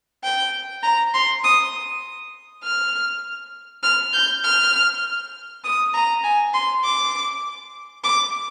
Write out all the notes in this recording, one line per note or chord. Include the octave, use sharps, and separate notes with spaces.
G5
A#5
C6
D#6
F6
F6
G6
F6
D#6
A#5
G#5
C6
D6
D6